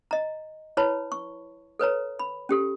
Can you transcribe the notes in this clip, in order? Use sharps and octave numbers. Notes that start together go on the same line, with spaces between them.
D#5 A#5
E4 B4 C#5 A5 B5
C#6
A4 B4 C#5 A#5
B5
C#4 G4 A4